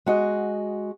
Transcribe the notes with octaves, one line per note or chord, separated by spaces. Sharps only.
G#3 F#4 D#5